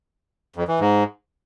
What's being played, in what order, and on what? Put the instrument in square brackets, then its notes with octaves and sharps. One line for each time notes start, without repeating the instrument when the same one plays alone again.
[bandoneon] F2
E3
G#2